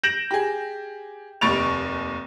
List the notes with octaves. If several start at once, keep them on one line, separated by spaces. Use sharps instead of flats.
G6 A#6 D7 E7 F#7
G4 G#4
F1 D#2 C#6 A6 D7 F7